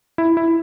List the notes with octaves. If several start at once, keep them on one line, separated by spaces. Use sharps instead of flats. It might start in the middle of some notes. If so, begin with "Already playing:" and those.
E4
E4